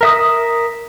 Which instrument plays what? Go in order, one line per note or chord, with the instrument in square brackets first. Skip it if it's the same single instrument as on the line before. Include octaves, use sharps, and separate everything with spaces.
[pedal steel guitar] A#4 E5 D#6